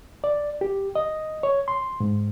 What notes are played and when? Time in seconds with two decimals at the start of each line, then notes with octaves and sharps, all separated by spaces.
0.24 D5
0.61 G4
0.96 D#5
1.43 C#5
1.68 C6
2.00 G#2